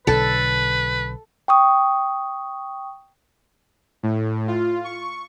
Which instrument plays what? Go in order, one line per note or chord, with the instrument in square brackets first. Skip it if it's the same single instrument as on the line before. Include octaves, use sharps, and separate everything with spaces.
[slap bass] B1 D3 [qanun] A4 [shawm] B4
[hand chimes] G5 C#6 D#6
[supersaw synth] A2
F4
C#6